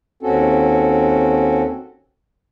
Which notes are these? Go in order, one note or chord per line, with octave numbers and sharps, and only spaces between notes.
D#2 C4 C#4 F#4 A4